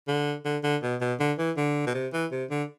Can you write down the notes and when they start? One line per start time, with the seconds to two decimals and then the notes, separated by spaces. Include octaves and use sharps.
0.08 D3
0.45 D3
0.64 D3
0.83 B2
1.01 B2
1.20 D3
1.38 E3
1.57 D3
1.87 B2
1.94 C3
2.13 E3
2.32 C3
2.50 D3